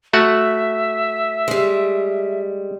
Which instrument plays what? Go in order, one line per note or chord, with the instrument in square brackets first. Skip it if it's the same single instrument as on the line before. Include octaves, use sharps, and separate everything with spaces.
[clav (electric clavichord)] A3 F#4 F#5 [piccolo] E5
[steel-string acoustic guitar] G3 G#3